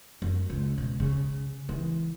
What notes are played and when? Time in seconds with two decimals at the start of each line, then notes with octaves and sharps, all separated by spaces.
0.22 F#2
0.50 C#2
0.78 B2
1.00 C#3
1.69 E3